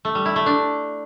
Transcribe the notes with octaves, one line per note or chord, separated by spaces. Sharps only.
A3
G3
E4
A3
D4